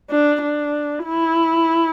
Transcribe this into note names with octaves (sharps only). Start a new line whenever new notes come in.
D4
D4
E4